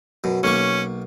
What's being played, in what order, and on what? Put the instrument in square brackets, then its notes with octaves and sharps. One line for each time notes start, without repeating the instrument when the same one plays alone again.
[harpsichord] F#2 B2
[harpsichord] B1 A#3 C#6 [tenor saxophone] C#4